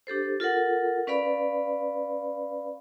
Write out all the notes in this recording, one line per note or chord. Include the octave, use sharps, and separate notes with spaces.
D4 G4 A4 C5
F4 A4 A#4 F#5
C#4 B4 D5 F5 B5